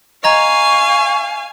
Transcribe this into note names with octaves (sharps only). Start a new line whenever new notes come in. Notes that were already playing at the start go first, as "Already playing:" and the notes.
D#5 F5 G#5 A#5 C#6 G#6